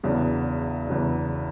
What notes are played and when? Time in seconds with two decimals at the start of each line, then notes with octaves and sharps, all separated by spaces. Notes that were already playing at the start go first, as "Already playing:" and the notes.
0.03 E2 C#3 F#3 B3 D4
0.87 E2 C#3 F#3 B3 D4